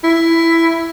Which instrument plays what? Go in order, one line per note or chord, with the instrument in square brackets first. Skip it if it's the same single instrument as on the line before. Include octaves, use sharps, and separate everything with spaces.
[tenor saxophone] E4